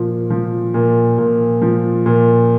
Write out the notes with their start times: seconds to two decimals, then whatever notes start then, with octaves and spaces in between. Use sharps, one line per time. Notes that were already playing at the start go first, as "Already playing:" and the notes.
Already playing: A#2 F3
0.30 F3
0.74 A#2
1.18 A#2
1.62 F3
2.06 A#2